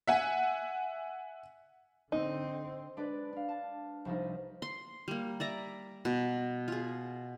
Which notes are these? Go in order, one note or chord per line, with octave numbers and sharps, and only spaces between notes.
E5 F#5 G#5
D3 C4 D#4
G#3 D4 B4 D5
D4 F5
A5
C2 F3 D#4
C6
G3 A#3
D5 E5 A#5
B2
F4 G#4